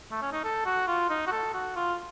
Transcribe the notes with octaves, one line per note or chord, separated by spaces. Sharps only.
A3
C#4
D#4
A4
F#4
F4
D#4
F#4
A4
F#4
F4